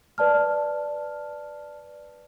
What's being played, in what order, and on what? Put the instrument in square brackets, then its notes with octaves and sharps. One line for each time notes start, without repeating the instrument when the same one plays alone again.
[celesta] B4 D5 A5 F6